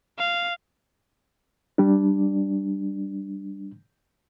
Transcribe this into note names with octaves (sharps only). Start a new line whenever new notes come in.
F5
G3 D4